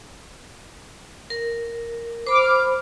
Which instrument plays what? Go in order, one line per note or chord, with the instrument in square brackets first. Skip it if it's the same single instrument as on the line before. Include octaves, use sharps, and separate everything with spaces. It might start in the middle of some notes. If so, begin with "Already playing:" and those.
[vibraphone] A#4
[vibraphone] C5 B5 [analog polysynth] D6 F6